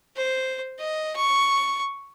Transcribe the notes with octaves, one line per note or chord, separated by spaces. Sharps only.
C5
D#5
C#6